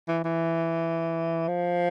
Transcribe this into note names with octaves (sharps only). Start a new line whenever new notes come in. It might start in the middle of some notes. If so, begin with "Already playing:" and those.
E3
E3
F3